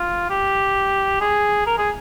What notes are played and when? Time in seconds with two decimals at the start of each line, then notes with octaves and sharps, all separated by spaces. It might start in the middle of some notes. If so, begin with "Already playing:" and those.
Already playing: F4
0.29 G4
1.21 G#4
1.66 A#4
1.78 G#4